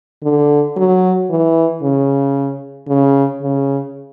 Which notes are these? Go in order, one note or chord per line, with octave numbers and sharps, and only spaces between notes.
D3
F#3
E3
C#3
C#3
C#3